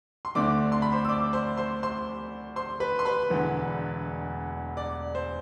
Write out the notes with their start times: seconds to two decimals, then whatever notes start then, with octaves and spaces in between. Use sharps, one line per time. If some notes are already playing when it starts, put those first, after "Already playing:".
0.25 C6
0.35 D2 D3 A3 C4 D5 D6
0.72 C6
0.82 B5
0.92 C5 C6
1.05 E6
1.09 D5 D6
1.33 C5 C6
1.57 C5 C6
1.83 C5 C6
2.56 C5 C6
2.80 B4 B5
2.99 C6
3.05 B4 B5
3.30 E1 E2 D3
4.77 D5
5.15 C5